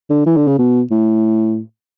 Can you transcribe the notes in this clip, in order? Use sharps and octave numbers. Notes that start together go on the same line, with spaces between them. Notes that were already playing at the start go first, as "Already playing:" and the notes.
D3
E3
D3
C#3
B2
A2